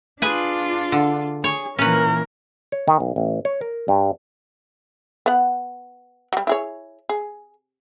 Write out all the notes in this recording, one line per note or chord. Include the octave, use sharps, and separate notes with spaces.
D4 F4 G#4 B4 G#5
D3
G#4 C#5
A#2 E3 C#4 A#4 B4
C#5
D#3
B1
A1
C#5
A#4
G2
B3 F#5
F#3 G3
E4 G#4 C#5
G#4